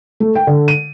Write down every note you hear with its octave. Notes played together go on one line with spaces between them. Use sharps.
A3
G5
D3
D#7